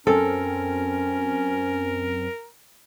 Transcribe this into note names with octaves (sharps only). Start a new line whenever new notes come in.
F#2 C4 C#4 A4 A#4